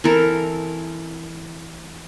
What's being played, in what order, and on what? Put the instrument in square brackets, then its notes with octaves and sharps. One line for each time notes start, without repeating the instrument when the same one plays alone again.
[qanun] E3 C4 A4 A#4